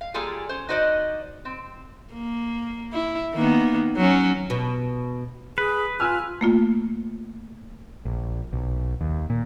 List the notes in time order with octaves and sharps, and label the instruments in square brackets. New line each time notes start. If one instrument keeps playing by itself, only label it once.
[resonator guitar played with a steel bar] F5
G3 A#3 F4 G#4 A4 G#5
C#4 C5
D#4 F#4 C5 D5 D#5
C4
[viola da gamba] A#3
E4
D#3 A#3 B3
F#3 C#4
[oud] B2
[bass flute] G#4 [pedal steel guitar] B4
[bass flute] F4 [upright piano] G#5 E6 F6
[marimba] A3 A#3 F4
[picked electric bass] A#1
B1
D#2
A#2